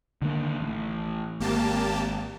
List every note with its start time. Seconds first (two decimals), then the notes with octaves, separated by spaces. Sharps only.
0.22 D3 D#3 A#3
0.60 A1
1.40 G#1 A#3 G4 A5